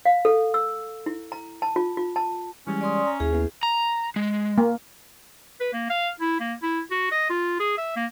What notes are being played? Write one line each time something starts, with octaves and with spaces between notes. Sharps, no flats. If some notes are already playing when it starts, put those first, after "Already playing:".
F5
A4
E6
E4
A#5
A5
F4
F4
A5
E3 G3 G#3 C#4
D5 C6 D#6
A#5
D#2 E4 G#4
B3 E4
A#5
G#3
A#3
B4
A#3
F5
E4
A#3
E4
F#4
D#5
F4
G#4
E5
A#3